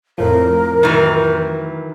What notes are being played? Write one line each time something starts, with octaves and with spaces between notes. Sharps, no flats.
F2 A2 F3 A#4
D#3 E3 F#3